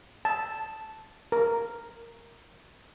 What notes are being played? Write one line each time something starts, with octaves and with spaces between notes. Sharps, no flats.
A5
A#4